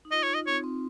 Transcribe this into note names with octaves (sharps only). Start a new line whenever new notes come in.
D#4
F4 D#5
C#5
D#4
D#5
C4 C#5
C4